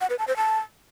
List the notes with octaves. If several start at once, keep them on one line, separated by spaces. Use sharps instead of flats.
F#5
B4
A5
C5
A5